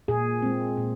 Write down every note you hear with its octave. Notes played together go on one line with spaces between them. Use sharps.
A#2 G#4
G#3 C4
A#2